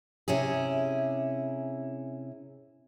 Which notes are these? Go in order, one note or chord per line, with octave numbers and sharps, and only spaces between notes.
C3 C#4 E4 G#4